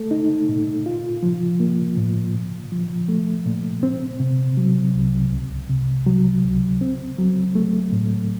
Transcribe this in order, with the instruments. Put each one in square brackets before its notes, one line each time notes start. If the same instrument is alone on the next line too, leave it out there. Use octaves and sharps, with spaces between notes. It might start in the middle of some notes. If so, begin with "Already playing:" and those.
Already playing: [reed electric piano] A3 A4
D#4
A#2
F4
F3
A#3
A2
A#2
F3
A3
A#2
C4
C3
F#3
C2
C#2
C3
F#3
C#2
C4
F#3
A3
A2